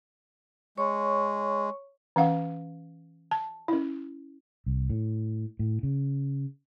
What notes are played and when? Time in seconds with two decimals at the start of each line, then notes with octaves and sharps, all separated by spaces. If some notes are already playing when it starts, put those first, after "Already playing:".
0.78 G#3 C#5 C#6
2.16 E3 C#4 F5 F#5
3.31 A5
3.68 C#4 E4
4.66 C2
4.90 A2
5.59 A2
5.83 C#3